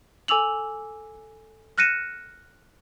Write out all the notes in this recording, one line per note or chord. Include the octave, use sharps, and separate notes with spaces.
A4 G#5 D6 E6 F7 F#7
F6 F#6 A#6 C#7 D#7 E7